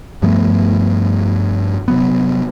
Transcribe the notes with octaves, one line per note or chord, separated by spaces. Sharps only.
G2 F3 A3 B3
C3 F#3 B3